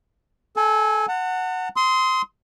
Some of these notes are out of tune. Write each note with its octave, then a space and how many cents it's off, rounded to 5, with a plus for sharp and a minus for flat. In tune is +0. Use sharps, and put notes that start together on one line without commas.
A4 -25 G#5 +0
F#5 +0 A5 +40
C6 -10 D#6 +30